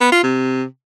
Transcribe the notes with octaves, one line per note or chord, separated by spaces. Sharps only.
B3
F4
C3